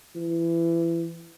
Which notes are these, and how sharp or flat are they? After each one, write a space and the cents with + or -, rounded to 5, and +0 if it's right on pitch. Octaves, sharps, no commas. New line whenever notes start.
E3 +25